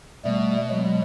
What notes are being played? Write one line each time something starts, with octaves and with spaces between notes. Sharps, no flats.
B2 G3 A3
F#3 G#3